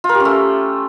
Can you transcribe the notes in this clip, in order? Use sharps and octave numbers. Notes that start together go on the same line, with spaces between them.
F4
A#4
G4
C#4
A3